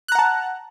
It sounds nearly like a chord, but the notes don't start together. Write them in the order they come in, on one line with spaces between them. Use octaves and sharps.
F#6 A#5 F#5 A5